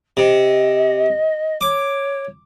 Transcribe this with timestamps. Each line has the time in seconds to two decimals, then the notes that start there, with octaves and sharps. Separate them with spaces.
0.17 C3 D#5
1.61 C#5 D6